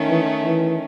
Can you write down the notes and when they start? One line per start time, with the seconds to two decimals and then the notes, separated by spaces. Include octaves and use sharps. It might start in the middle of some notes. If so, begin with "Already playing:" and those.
Already playing: D#3 A3 C#4
0.10 E3
0.45 E3